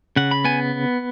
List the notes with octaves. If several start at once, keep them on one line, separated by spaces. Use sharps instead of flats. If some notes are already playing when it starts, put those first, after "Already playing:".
C#3 F#5
B5
B3 G#5